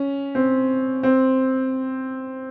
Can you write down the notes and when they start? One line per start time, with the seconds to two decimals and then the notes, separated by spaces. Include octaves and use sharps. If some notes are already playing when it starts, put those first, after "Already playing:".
Already playing: C#4
0.35 C4
1.03 C4